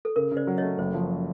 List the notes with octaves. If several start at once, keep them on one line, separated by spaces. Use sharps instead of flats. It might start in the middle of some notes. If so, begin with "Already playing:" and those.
A4
C#3 A#4
C#3
C5 D5
F#3
A3 C#5 D#5
F#1 C5
F3